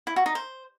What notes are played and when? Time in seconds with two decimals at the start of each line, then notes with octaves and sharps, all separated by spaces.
0.07 E4
0.16 F#4
0.26 D#4
0.35 C5